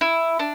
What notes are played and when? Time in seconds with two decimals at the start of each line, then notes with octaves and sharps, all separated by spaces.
0.01 E4
0.39 D4